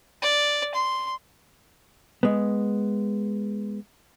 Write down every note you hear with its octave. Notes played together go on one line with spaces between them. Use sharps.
D5
C6
G#3 B3